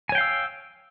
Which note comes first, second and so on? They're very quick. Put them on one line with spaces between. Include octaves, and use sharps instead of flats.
G#5 C#5 G5 F5 E6